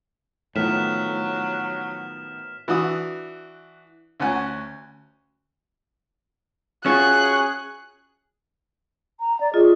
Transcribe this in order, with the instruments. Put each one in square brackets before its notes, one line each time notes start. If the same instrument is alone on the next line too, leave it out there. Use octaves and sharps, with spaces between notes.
[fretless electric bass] A2 [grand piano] D#3 F3 B3 [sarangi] F#3 [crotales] F6 B6 E7
[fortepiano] E3 D4 F#4 D#6
D2 C#4 F#5 G#5 F#6
[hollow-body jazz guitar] C#4 F4 F#4 [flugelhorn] G#4 [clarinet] C#6 [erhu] F#6
[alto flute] A#5
D5
[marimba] F4 D#5 [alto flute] G#4